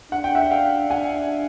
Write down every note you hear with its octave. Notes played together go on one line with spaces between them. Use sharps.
D4 F#5
G5
E5 F#5
F5 G5
F#5 G#5